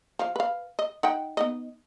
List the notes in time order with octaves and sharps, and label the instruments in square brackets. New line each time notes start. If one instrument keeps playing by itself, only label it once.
[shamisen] F3 F5
B4 F5
D#5
D#4 F#5 G5
B3 D#4 D#5